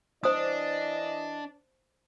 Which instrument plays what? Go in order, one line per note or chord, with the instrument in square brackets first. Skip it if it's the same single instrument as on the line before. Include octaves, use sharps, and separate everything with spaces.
[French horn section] E3 E4 D#5 [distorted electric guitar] D4 [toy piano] C5 D#6